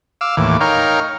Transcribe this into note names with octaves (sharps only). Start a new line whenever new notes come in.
F5 D6 E6
D#2 A2 E3 D6
D#4 A#4 C#5 F5 G5